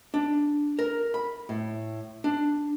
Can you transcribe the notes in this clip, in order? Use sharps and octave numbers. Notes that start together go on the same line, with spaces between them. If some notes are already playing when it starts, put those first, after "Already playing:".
D4
A#4
B5
A2
D4